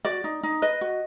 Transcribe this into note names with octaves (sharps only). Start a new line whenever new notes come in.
F#4 D5
D#4
D#4
B4 D#5
F#4